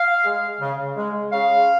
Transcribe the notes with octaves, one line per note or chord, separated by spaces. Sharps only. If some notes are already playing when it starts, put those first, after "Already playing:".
Already playing: F5
G#3
C#3
G#3
C#3 F5